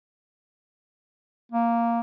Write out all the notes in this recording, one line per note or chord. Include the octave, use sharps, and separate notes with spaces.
A#3